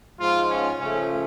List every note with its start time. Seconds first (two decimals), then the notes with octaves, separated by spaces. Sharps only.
0.19 G#2 F3 G#3 F4
0.49 C#4
0.80 C#3 F3 A3 C#4